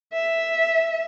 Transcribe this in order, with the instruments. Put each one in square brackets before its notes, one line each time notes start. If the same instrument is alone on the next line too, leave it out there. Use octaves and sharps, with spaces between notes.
[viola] E5